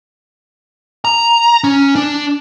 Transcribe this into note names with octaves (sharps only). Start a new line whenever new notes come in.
A#5
C#4
D4